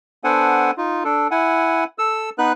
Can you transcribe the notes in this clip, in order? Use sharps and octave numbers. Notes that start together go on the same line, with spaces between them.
B3 D4 A4 C5 F#5 G#5
D#4 F4
D4 A4
E4 F#5 G#5
A4 E6
B3 D#4 B4 F#6